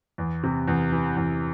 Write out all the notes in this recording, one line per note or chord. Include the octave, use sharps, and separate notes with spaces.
E2
C3
E2
E3
E2